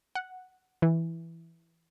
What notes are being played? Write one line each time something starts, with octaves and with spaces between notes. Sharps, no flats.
F#5
E3